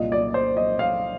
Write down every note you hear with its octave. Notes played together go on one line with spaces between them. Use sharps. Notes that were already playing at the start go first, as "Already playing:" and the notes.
Already playing: C2 A#2 D#5
D5
C5
D#5
F5